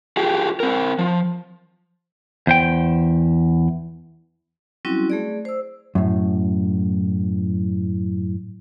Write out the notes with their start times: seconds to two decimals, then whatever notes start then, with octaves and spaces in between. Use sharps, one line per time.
0.17 F4 G4 G#4
0.60 C4 A#4
0.99 F3
2.47 E2 C5 G5
4.85 F#3 G3 C4 C#4 E4 F#4
5.10 A3 G#4 D5
5.45 C5 E6
5.95 F#2 A2